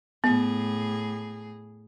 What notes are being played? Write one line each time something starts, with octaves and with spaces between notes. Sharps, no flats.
A2 B3 G#4